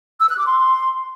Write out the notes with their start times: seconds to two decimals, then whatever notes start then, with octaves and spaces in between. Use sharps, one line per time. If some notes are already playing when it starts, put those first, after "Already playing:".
0.19 E6
0.28 F#6
0.37 D6
0.46 C6